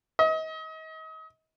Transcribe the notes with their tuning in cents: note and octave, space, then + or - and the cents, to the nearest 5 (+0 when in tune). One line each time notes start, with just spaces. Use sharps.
D#5 +35